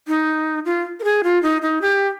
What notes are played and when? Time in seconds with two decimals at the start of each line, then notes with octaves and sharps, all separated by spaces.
0.08 D#4
0.65 F4
1.00 A#4
1.04 G#4
1.24 F4
1.43 D#4
1.62 D#4
1.82 G4